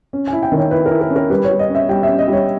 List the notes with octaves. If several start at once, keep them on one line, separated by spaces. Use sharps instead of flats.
C#4
G#5
E4
G5
D#3
C#5
E4 B4
A#4
E4
A#4
C#4
A#4
G3 B4
G3 C#5
D#5
C#4
E5
G3 G5
E5
C#4
D#5
G3 C#5